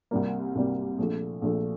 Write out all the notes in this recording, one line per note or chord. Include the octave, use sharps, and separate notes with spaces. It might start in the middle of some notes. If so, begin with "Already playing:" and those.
C2 C3 G3 A#3
C2 C3 G3 A#3
A#1 A#2 F3 A3
A#1 A#2 F3 A3